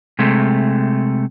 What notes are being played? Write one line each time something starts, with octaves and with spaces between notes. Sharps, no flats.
C3 G#3 A3